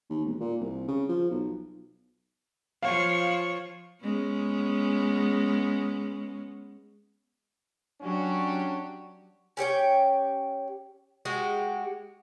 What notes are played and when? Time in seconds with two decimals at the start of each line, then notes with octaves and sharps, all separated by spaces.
0.10 D#2
0.25 E1
0.40 A#2
0.61 C2
0.88 C#3
1.09 F3
1.31 B1
2.82 F3 C#5 F5
4.03 G#3 B3 C#4
8.01 F#3 C#4 D4 F#4 G4
9.57 C#4 G4 C#5 G5
11.25 G#3 F#4 G4